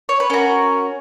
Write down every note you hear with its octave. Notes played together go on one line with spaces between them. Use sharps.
C#5
B4
C#4 F#4 A#4